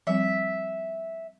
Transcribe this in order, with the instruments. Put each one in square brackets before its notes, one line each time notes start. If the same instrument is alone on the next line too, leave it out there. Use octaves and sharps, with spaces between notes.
[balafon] F3 G3 C4 [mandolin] E5